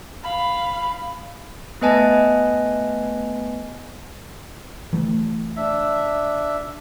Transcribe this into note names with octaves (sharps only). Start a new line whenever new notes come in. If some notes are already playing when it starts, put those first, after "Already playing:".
F5 B5
A3 B3 B4 D#5 G#5 A5
E3 A3
D4 E5